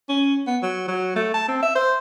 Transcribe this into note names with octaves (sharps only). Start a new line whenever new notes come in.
C#4
B3
F#3
F#3
A3
A5
C4
E5
C5